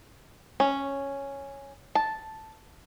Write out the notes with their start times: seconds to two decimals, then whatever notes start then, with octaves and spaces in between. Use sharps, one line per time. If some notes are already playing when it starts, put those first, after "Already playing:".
0.60 C#4
1.95 A5